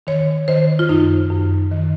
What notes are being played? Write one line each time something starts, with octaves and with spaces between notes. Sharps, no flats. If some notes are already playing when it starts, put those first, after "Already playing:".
D#3 C#5
D#3 C5
F4
F#2 D#4
F#2
D#3